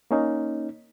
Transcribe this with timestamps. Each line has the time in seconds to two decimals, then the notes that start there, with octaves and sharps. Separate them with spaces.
0.11 A#3 C#4 D#4